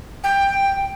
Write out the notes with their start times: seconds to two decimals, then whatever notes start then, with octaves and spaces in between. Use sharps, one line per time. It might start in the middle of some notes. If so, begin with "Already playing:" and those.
0.24 G5